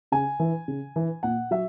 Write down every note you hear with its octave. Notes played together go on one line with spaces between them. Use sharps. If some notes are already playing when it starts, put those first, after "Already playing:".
C#3 G#5
E3
C#3
E3
A#2 F#5
F#3 E5